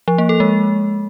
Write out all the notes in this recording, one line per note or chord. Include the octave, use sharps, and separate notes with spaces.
F3
A#3
A4
G#3